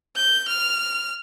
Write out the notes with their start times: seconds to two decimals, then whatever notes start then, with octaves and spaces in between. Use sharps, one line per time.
0.16 G6
0.49 F6